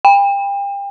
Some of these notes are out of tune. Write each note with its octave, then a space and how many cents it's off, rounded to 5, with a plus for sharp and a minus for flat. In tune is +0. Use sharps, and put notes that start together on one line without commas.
G5 +35